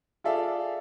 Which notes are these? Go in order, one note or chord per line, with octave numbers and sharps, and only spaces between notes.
F4 G#4 A4 D5 E5 F5